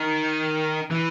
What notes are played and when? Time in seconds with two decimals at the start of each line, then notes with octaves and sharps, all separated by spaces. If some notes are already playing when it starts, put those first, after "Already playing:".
Already playing: D#3
0.91 E3